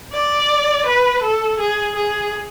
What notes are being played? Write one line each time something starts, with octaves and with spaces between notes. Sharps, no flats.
D5
B4
A4
G#4
G#4